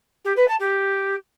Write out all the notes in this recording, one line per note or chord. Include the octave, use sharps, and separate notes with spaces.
G4
B4
A5
G4